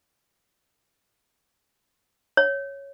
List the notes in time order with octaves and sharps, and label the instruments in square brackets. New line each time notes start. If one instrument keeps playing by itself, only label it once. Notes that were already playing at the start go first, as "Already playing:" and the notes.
[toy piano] C#5